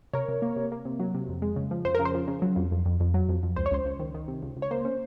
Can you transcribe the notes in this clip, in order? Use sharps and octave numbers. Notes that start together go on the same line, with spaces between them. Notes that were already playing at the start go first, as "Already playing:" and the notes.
C3 A#4 C#5
C3
A#3
C3
A#3
C3
F#3
C3
F2
G#3
C#3
F3
F2 C5
C#3 A#4
C5
F3
C#3
F#3
F2
F2
F2
F2
F#3
F2
F2
C#2 C5
C#5
C#2 C5
C#2
D#3
D#3
C3
C#2
C#2
C#5
A#3 C5
C#4